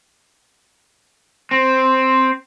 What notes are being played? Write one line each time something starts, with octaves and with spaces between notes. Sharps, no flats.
C4